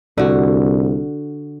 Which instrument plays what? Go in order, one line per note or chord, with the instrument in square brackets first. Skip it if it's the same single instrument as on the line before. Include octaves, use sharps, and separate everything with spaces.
[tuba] C2 [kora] D3 F#4